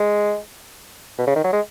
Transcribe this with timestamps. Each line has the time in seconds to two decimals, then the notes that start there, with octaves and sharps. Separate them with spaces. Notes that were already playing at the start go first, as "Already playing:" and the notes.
Already playing: G#3
1.19 B2
1.27 C#3
1.36 D#3
1.44 F#3
1.53 G#3